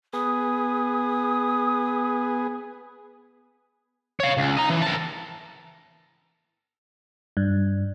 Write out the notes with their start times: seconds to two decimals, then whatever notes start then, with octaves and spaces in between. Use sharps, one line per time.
0.13 B3 G#4 D#6
4.20 C#5 F5
4.37 C#2
4.57 D#5 A#5
4.70 E3
4.82 A#4 A5
7.37 G2